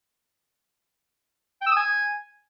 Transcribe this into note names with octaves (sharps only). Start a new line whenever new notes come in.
G5
E6
D#6
G#5